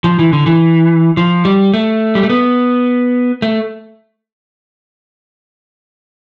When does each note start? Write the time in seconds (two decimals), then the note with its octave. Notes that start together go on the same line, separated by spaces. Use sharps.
0.04 F3
0.19 E3
0.33 D3
0.46 E3
1.17 F3
1.45 G3
1.74 A3
2.15 G3
2.23 A3
2.30 B3
3.42 A3